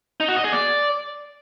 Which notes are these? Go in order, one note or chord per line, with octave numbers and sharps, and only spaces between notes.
D#4
F#4
D#5
G#4
D5